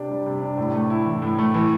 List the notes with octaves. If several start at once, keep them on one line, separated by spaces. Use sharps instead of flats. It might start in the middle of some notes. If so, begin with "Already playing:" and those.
Already playing: C3 D4 G4
G3
C3
D4
A2
A3
E4
E3
A2
A3
E3